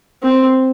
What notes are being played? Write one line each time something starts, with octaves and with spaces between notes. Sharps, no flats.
C4